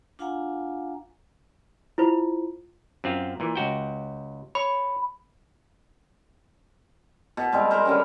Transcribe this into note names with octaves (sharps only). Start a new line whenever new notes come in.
D4 F4 F5 F#5 G#5 A#5
E4 F4 C5
F#2 C4 F4
A#2 E3
C#2 F#4 G5
C#5 B5
B2
G3 G#3 C4
A#4 C5 A#5 B5
D3 G3 C#4